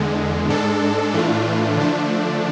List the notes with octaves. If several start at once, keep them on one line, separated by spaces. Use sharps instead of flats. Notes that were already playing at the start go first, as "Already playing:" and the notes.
Already playing: E2 D3 G#3
G#2 G#3 D4 A4
A2 E3 A3 D4 F4
D3 F3 A3 D4